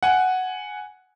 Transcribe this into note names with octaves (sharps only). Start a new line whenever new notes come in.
F#5 G#5